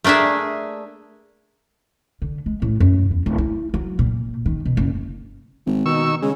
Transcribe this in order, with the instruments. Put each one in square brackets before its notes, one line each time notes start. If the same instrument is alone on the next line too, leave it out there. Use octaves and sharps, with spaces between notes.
[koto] A3 A#3 D4 G#4 E5
[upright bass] D3
G#3
A2
F#2
E2
D1
E4
F#3
A#2
D#3
B2
F#1
[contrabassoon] G#1
[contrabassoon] B2 [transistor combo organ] D#3 C#6 E6
[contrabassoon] C#3 [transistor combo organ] G#3